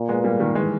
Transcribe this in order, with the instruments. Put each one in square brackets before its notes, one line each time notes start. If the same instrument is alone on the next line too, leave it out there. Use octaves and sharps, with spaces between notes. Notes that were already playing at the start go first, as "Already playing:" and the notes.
Already playing: [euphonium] A#2
[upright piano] G#3 B3
G3 A#3
D#3 G3
E3 G#3